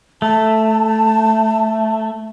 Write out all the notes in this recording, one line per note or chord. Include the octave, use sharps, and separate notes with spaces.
A3 A5